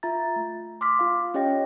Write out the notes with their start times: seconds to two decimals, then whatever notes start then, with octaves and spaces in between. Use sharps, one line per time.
0.03 F4 E5 A#5 A6
0.36 A3
0.81 C6 D6 D#6 F6 B6
0.99 F4 F5
1.34 C#4 G4 C#5 D#5 G5 A#6